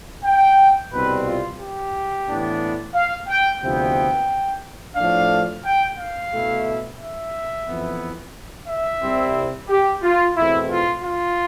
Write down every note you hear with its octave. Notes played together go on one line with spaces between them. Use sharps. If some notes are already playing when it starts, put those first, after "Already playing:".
G5
C2 B2 G3 C4 B4
F4
G4
A2 E3 B3 D4
F5
G5
D2 C3 F3 B3 E4 G5
A2 F3 A3 D4 F5
G5
F5
B2 A3 E4
E5
F2 E3 B3 E4
E5
C2 C3 G3 C4 E4
G4
F4
E2 B2 A3 C4 E4
F4
F4